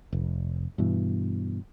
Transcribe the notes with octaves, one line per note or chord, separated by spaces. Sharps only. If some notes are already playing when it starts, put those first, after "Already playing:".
F1
G2 B2 E3